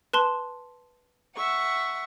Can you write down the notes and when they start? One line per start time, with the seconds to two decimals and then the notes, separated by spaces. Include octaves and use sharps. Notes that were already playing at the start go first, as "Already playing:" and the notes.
0.13 B4 A5 C6
1.34 E5 F#5 C#6